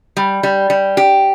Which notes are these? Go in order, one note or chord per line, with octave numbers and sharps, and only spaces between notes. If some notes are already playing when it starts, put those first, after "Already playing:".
G3
G3
G3
G4